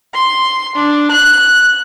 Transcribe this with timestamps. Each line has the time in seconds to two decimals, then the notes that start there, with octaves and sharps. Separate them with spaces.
0.14 C6
0.75 D4
1.11 F#6